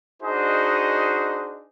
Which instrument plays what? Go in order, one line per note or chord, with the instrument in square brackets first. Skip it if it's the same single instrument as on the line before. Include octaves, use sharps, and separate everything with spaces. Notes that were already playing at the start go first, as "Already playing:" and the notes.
[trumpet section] D4 D#4 F#4 G#4 C5 D#5